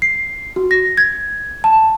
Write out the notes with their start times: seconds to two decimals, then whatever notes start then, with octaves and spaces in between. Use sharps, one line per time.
0.02 C7
0.56 F#4
0.71 A#6
0.97 G#6
1.64 A5